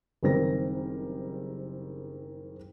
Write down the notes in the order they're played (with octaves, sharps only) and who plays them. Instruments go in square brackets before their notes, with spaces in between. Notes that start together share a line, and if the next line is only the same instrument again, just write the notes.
[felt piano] F#1 D#3 G3 C4 A#4 A#6